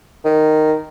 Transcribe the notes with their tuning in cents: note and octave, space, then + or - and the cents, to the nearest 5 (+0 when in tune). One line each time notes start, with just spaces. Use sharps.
D#3 -5